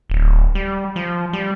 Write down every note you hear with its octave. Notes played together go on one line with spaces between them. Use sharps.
D1
G3
F3
G3